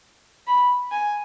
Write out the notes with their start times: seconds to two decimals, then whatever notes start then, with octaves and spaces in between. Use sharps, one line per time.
0.47 B5
0.91 G#5